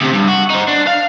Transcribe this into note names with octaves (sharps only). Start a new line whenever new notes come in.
D2 C3
G2
F#4
D#4 C5
D4
F5